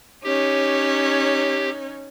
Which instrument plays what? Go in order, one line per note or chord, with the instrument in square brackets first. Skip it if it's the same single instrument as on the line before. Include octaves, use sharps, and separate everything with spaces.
[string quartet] C#4 D#4 C#5 [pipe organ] G4